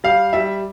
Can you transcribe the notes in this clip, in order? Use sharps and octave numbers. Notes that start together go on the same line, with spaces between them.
G3 F5
G3 E5